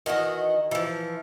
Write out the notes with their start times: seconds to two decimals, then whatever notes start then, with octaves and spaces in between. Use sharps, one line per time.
0.06 D#3 E3 F#4 D#5
0.71 E3 F3